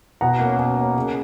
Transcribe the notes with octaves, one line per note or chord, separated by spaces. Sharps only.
B2 F#5 A#5
A#3
C#4
B2
A#3 C#4
C#3